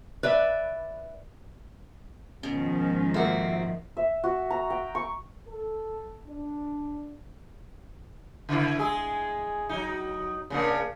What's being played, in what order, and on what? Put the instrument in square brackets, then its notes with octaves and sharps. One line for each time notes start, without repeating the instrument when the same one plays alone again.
[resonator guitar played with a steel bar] B4 D5 E5
[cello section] G#2 D#3 F3 [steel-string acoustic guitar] B2 [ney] C#4
[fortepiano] F2 A3 A#3 [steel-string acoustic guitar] C4 F#4 [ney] E5
[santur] E5
F#4
A#5
G5
C#6
[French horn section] A4
D4
[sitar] C#3 E4
G#3 G#4
F#3 D#4
C#3 A#3 D4